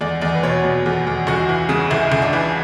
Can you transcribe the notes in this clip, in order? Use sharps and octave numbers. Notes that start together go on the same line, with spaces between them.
E2 D5
E2 D5
B4
B2 C#5
B2
E2
E2
C#2 F#4
E3
C#3
C#2 E4
C#2
D4
E3